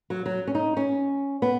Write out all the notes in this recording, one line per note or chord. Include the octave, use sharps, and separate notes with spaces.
F#3
F#3
C#4
D#4
C#4
B3